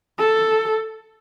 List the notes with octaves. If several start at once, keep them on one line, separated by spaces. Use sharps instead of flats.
A4